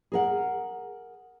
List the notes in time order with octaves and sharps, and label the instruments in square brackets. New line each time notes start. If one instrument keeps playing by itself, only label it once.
[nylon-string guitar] G#4 A#4 F#5